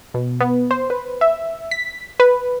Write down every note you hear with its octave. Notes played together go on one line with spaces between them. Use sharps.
B2
B3
C5
B4
E5
B6
B4